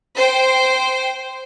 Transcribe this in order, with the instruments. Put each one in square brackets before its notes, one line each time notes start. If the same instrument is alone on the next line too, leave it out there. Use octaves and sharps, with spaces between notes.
[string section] C5 G5